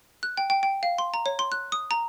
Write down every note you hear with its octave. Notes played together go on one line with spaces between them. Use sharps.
F#6
G5
G5
G5
F5
C6
A#5
C#5
C6
F#6
D#6
A#5